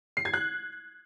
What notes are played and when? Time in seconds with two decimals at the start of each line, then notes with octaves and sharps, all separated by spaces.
0.17 C7
0.25 G#6
0.34 F#6